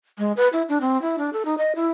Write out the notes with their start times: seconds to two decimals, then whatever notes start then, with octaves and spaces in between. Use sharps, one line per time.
0.18 G#3
0.37 B4
0.53 E4
0.69 D4
0.81 C4
1.02 E4
1.18 D4
1.33 A4
1.45 D#4
1.58 D#5
1.75 E4